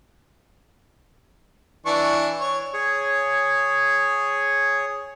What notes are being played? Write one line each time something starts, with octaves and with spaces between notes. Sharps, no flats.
E3 D4 C#6
C#5
G#4 C#5